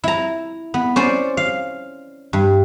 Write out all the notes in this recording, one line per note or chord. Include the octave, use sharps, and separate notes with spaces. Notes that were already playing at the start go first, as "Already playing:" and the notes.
E4 A#5
B3
C#4 C5 D5
F5
G2